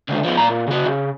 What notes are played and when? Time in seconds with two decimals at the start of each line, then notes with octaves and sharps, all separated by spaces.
0.09 C#2 D3
0.24 F3 B3
0.37 A#2 A#5
0.49 A#2
0.68 C#3 F#4
0.86 C#3